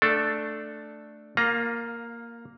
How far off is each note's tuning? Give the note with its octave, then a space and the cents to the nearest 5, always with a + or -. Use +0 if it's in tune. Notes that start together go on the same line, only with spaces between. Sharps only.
A3 +0 D4 +5 A4 +0
A#3 +0 F4 +25 A#5 +10